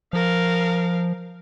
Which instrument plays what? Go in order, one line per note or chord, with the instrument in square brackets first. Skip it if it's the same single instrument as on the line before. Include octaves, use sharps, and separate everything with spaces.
[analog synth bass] F3 [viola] A#4 F5